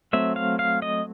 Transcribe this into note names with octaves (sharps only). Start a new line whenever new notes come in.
F#3 A3 C4 E5
F5
F5
D#5